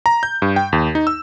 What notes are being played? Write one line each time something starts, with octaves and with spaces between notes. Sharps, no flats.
A#5
G6
G2
G5
D#2
D#4
E6